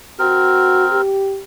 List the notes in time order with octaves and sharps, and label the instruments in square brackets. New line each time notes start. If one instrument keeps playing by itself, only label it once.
[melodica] C4 A#4 [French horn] F#4
[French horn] G4